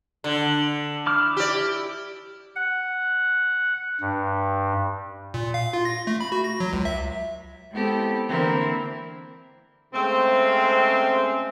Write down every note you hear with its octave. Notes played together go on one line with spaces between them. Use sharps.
D3
E4 D6 F6
G4 D5
F#5
G2
A#2
F5
F4
A#6
A3
B5
F#4
A#6
F#3
C#2
E5
G#3 B3 C4 E4 G4 A4
D3 E3 A#3 C4 E4 A#4
C#3 G#3 A3 C4